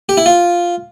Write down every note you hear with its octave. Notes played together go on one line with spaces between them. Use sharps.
G4
E4
F4